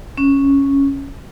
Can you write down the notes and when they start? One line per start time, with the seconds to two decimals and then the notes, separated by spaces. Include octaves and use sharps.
0.18 C#4